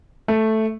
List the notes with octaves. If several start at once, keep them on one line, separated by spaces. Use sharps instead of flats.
A3